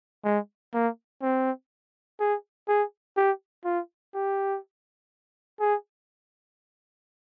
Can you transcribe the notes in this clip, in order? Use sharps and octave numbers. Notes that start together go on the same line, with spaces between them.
G#3
A#3
C4
G#4
G#4
G4
F4
G4
G#4